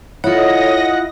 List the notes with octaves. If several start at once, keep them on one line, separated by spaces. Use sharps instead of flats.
E4 F4 A4 C#5 D#5 F#5 A#6